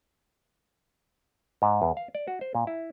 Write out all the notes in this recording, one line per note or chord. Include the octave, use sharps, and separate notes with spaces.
G#2
E2
F5
D5
F#4
C5
A#2
E4